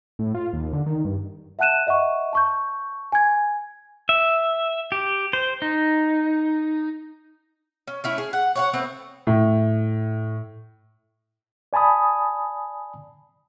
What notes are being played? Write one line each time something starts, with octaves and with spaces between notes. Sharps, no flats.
A2
F4
D#2
D3
D#3
G2
E5 F#5 A5 F#6 D#7 E7
D#5 E5 F#5 C#6
A5 C#6 G6
G#5 G#6
E5
G4
C5
D#4
C#4
A3 C#4 E4
G#4
F#5
C#5 F5 F#5
A3 B3 C4
A2
D5 G#5 A5 B5 D#6